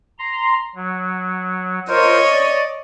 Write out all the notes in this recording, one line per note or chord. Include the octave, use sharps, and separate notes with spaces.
A#5 C6
F#3
F4 A#4 C5 C#5 D#5
D5